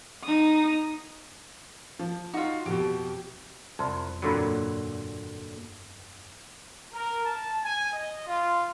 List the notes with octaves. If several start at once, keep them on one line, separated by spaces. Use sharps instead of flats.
D#4 D#6
F3
D#4 F4 F#4
F2 B2 G4
C2 F2 C6
G2 A#2 D3 F#3 C4 B5
A#4
A5
G#5
D#5
F4